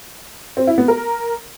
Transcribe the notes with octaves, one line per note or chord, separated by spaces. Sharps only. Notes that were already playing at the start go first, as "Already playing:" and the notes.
C4
E4
B3
A#4